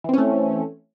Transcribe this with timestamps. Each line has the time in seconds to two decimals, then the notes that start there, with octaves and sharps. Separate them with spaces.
0.04 E3
0.09 C4
0.13 C#4
0.18 A3